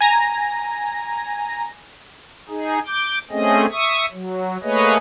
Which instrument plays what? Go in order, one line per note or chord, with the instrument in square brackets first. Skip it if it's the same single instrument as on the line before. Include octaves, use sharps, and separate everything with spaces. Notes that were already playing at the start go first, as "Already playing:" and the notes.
[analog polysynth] G#5 A#5 A#6
[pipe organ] D#4 G#4
D6 G6
A3 C4 C#4 G#4 D#5
E5 C#6 D#6
F#3
A3 A#3 G#4 B4 C#5 D#5